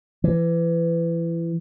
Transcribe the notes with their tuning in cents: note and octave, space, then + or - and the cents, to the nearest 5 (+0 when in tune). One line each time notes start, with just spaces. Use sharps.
E3 +25